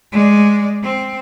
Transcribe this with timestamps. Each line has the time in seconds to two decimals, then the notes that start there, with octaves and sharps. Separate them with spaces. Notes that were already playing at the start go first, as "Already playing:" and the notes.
0.12 G#3 D5
0.83 C4